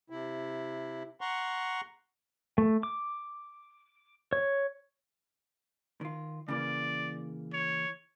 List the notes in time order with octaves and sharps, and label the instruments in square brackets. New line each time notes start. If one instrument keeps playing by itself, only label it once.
[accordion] C3 E4
F#5 A#5 C6 C#6
[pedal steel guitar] A3
D6
C#5
[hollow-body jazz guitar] D#3 F4
[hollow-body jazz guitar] C#3 E3 A#3 [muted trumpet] D5
[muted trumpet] C#5